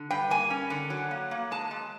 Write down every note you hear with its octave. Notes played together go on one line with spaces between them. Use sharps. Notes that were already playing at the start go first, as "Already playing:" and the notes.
Already playing: D3
G2 G5
A#3 G#5
C#4
D3
F#3
A#3
A#3
G#3 A5
G#3